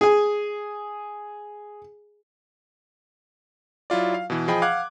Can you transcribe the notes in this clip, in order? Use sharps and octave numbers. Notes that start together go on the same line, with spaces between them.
G#4 G#5
F#3 E4 F4 D5
F5
B2 E3
F3 G#4 D#5 G5 B5
F5 F#5 D6 F#6 G#6